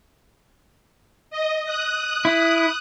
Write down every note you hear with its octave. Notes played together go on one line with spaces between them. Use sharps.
D#5
D#6 F#6
E4